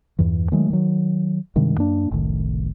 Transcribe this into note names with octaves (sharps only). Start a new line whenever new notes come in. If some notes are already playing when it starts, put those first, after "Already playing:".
E2 G2 E3
D#3 F#3 G#3 A3
D#3 F#3
G2 C3 D#3 G#3
F#2 A#3 D4
F#1 C2 A2 D#3